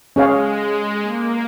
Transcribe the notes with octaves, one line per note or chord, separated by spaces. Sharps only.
G#3 C#4 G#4 C#5 F5
A#3